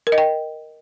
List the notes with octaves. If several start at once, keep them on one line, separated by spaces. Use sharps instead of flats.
A#4
D#5
G5